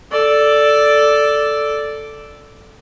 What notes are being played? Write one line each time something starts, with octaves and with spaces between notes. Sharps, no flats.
A4 D5